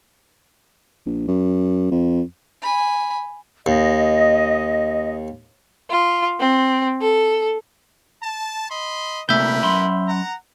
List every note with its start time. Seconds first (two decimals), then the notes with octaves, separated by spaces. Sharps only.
1.06 A#1
1.28 F#2
1.91 F2
2.62 G#5 B5
3.66 D#2 D#5
5.89 F4
6.39 C4
7.00 A4
8.22 A5
8.70 D#5 B5 C6
9.29 C3 A3 A#3 E4 A#4 B4 E5 G6
9.63 F#2 B5 C6
10.07 F#5 A#5